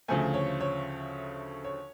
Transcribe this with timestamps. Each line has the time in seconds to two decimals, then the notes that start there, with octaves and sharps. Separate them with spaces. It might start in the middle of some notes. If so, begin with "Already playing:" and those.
0.08 D2 C#3 F3 A3 G#5
0.34 C#5
0.61 C#5
1.64 C#5